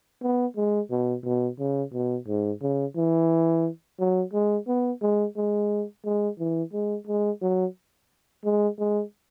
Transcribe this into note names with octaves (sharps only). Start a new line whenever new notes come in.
B3
G#3
B2
B2
C#3
B2
G#2
C#3
E3
F#3
G#3
B3
G#3
G#3
G#3
E3
G#3
G#3
F#3
G#3
G#3